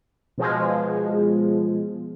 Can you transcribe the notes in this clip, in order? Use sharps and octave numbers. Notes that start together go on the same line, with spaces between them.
B2 F3 G#3